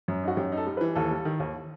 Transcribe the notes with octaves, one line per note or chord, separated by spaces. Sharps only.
F#2
D#4 F#4
F#2 G4
D#4
A4
G3
B4
E3
D#2 A4
G3
D#3
D#2